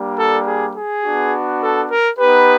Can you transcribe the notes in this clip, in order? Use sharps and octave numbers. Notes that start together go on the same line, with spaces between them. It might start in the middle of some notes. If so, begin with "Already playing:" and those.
Already playing: G3 A#3 D4 G4
A4
G#4
G#4
B3 D4 F#4
A4
A#4
B3 D#4 G4 B4